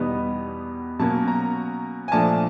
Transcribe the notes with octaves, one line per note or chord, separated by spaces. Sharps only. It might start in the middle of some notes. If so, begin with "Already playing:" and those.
Already playing: E2 B2 G3 B3 D#4
B2 F#3 A#3 C#4 A5
A#5
G#5
A#2 F3 A3 D4 A5